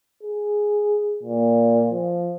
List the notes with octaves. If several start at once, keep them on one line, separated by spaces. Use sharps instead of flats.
G#4
A#2
F3